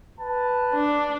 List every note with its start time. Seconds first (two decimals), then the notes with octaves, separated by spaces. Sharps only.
0.20 B4 A5
0.74 D4